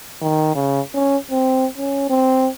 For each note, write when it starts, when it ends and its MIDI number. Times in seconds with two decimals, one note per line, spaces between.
0.22 0.53 51
0.55 0.81 49
0.94 1.17 61
1.31 1.66 60
1.78 2.07 61
2.10 2.49 60